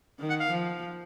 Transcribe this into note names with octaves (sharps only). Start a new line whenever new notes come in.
D#3
F#5
F5
F3